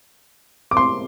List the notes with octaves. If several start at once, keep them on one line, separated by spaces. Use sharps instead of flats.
D6
C6